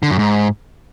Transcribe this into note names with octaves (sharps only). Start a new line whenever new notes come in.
D3
F#2
G#2